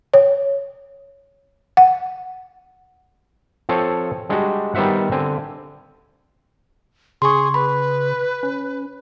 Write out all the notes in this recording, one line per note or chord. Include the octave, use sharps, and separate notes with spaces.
C#5
F#5
F3 C4 A4 C5 C#5
G3 G#3 D4 F#4 G4
D#3 G3 B3 C5 E5 F#5
D3 C4 G#5
C#3 G#4 C6 C#6
B4 B5
C#4